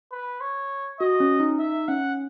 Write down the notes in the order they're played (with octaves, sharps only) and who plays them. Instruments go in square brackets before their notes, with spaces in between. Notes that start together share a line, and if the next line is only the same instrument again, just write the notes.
[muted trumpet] B4
C#5
[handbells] F#4 [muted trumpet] D#5
[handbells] C#4
D#4
[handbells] D#4 [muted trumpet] E5
[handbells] C#4 [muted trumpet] F#5